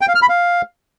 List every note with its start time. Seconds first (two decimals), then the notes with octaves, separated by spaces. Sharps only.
0.01 G5
0.08 F5
0.15 F6
0.22 B5
0.29 F5